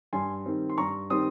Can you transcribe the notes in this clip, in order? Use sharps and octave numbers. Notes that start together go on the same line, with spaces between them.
G2 G#5 C6
D#3 G3 C4
C6
G2 A#5 C#6
D#3 G3 C4 C6 D#6